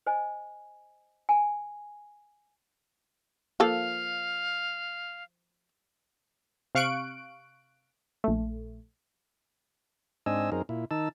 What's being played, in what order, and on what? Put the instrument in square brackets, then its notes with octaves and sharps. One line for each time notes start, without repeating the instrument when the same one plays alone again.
[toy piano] C5 D#5 G#5
G#5
[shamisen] F3 A#3 A4 [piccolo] F5
[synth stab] C3 F5 C#6 F#6 D7
A#1 A3
[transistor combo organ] G#2 C4 D4 D#5 G#5 E6
F#2 C4 D#4 G#4 A#4
A#2 E4
D#3 D#4 A5 E6